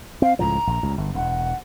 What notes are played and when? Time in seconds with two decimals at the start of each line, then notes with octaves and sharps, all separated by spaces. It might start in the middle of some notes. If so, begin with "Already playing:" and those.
0.22 C4 F5
0.39 C#2 A2 F3 A#5
0.67 A#1
0.83 C#2
0.98 G1
1.15 E1 F#5